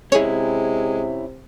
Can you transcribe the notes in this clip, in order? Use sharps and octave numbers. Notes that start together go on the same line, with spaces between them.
C3 G#3 C#4 E4 G#4 C#5